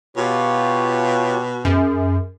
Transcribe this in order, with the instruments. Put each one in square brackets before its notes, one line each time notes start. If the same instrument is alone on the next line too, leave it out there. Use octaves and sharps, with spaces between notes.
[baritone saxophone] B2 [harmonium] F4 G4 C#5
[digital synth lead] F#2 [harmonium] G#4